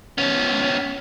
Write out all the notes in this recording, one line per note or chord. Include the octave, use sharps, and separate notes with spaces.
B3 C#4